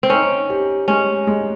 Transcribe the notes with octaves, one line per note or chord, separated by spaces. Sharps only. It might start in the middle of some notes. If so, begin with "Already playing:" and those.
C4
C#4 D#4
G4
G#3 C#4
G#3